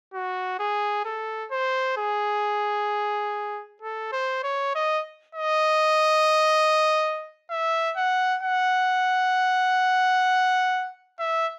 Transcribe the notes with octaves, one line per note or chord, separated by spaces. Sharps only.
F#4
G#4
A4
C5
G#4
A4
C5
C#5
D#5
D#5
E5
F#5
F#5
E5